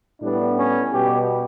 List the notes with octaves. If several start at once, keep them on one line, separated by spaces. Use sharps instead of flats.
A2 G3 B3 D4
C#4
B2 G3 B3 G4